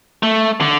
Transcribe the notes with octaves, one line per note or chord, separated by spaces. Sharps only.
A3
D3